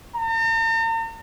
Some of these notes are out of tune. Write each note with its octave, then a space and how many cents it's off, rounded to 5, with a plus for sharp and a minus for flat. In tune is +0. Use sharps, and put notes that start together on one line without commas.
A#5 -45